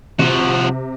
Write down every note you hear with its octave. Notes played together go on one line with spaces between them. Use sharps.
C3 F3 F#4